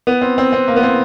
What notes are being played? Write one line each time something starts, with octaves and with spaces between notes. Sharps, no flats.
B3
C4
C4
C4
A#3
B3
C4